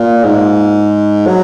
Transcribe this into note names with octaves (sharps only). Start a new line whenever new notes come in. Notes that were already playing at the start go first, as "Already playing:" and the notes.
Already playing: A#2
G#2
F#3